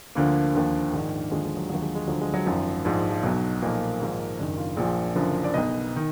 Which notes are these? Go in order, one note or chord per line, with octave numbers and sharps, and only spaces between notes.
D2 D3 F3 A#3
D#2 D3 F3
A#1 G#2 D#3
D#2 D3 F3 G#3
G#3
F#3
D#2 D3 F3 F#3
G#3
G#3
D2 D3 F3 F#3
G#3
F#3
G#1 F#2 F3
A#1 G#2 F3
F3
B1 B2 F#3
B1 A#2 F3 A#3
G#1 G#2 F3
F#1 F#2 D#3 D4
F4
A#1 A#2 F3 G#4
F#1 F#2 D3 F3
D5
B1 B2 D#5
D#3